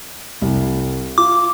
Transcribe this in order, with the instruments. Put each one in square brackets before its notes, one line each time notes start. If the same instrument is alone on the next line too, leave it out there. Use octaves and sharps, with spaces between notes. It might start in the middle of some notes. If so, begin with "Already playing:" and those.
[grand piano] C2
[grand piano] F4 [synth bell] D6